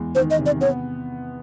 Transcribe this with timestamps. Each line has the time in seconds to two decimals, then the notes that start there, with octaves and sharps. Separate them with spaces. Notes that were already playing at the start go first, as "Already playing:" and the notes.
Already playing: E2 G#3
0.15 D#3 C5
0.31 D#5
0.38 C3
0.46 D5
0.61 B3 C#5